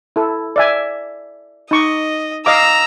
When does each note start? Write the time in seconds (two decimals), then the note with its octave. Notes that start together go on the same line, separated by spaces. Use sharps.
0.16 E4 A4
0.56 D5 E5 G#5
1.71 D#4 D#5 C#6 D6
2.46 D#5 F5 A#5 D6 E6